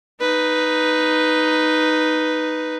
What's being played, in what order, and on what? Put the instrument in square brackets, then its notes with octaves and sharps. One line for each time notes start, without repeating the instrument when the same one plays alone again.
[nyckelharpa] D#4 B4